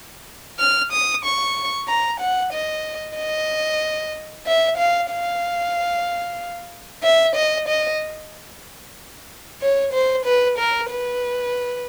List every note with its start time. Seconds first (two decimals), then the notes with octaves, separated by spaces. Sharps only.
0.59 F6
0.92 D#6
1.25 C#6
1.88 A#5
2.20 F#5
2.53 D#5
3.17 D#5
4.46 E5
4.78 F5
5.11 F5
7.03 E5
7.35 D#5
7.69 D#5
9.61 C#5
9.93 C5
10.25 B4
10.58 A#4
10.90 B4